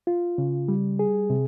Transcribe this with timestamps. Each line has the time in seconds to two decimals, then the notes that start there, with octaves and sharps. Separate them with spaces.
0.07 F4
0.38 C#3
0.68 G3
0.99 G#4
1.30 C3